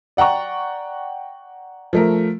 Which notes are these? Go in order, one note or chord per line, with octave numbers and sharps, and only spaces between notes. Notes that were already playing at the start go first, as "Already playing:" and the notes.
D5 F#5 G5 A#5 C#6
F3 A3 A#4